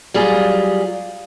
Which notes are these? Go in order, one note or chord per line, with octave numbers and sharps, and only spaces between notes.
F#3 G3 F4 G#4